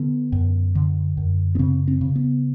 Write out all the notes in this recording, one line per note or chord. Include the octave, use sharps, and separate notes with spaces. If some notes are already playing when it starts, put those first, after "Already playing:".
Already playing: D3 B3
F#2
D3
F#2
B3
C#3 C4
C4
C#3
B3